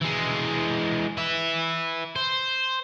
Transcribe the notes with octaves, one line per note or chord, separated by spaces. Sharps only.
E3 G#3
B4 E5
C5